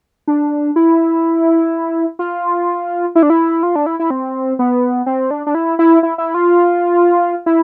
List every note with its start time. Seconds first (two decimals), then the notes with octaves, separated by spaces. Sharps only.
0.28 D4
0.76 E4
2.19 F4
3.15 E4
3.23 D4
3.30 E4
3.63 F4
3.76 D4
3.86 E4
4.00 E4
4.10 C4
4.59 B3
5.06 C4
5.31 D4
5.47 D4
5.55 E4
5.79 E4
6.03 E4
6.18 E4
6.34 F4
7.46 E4